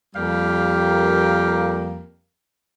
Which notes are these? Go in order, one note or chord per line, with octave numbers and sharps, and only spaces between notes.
F2 G3 A#3 G4 A#4 F5